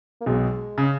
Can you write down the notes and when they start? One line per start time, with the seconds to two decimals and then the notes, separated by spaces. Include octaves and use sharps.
0.21 A#3
0.26 B1 B2 G#3
0.78 C#3